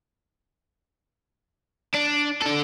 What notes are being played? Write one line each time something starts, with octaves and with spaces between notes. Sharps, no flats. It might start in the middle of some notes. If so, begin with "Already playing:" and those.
D4
D4 A4